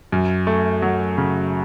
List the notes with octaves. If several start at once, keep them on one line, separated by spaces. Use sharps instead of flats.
F#2
A3
F#3
C#3